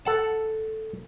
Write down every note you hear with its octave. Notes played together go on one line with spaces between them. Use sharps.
A4 F#5 A5